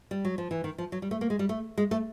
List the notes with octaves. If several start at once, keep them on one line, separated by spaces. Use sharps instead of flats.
G3
F#3
F3
E3
D#3
F3
F#3
G3
A3
A#3
G#3
G3
A3
G#3
A3